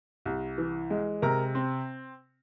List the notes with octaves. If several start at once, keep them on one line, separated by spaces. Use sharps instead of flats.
C2
E3
G#3
C3 A#4 A#5
C4